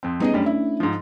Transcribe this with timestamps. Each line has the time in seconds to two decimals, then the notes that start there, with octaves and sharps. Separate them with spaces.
0.03 F2 C4
0.20 G3 B3 C#4 D#4 G#4 D#5
0.34 F#2 G3 A3 C#4 D4
0.46 E4
0.80 G#2 F3